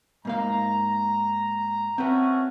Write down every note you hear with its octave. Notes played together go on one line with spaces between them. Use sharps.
G#2 A#3 F5 A#5
A3 C4 C#4 F#4 B4